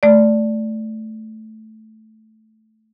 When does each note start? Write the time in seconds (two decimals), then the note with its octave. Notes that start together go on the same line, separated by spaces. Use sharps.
0.03 A3 D5